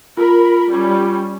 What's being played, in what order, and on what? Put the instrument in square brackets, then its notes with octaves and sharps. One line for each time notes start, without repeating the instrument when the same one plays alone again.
[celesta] F4 [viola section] A#4 B5
[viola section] G3 C#4